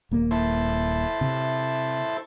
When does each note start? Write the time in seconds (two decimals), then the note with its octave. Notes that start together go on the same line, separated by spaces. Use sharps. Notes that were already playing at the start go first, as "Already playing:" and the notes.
0.11 D#1 A#3
0.31 E4 A4 C5
1.21 C3